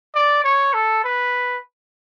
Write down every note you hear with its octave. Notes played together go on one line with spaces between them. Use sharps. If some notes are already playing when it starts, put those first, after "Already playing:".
D5
C#5
A4
B4